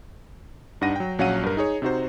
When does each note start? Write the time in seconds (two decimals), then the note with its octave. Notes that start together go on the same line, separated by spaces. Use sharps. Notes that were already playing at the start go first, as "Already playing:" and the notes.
0.81 G2 D4 D#4 F#5 A#6 D#7
0.96 F#3 G5
1.19 A#1 F#3 C#4 F5 F#5 D#7
1.43 G2 A#4
1.57 D#4 G#4 C#5
1.82 C3 D#4 F#4 C5